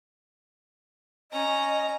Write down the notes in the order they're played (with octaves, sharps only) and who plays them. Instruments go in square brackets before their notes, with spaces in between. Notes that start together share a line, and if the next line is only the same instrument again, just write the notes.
[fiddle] C#4 A#5 [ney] D#5